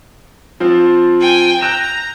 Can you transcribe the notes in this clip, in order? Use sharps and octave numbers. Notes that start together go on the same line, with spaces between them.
F3 C4 F4
G5 G#5
A#5 F#6 G6 E7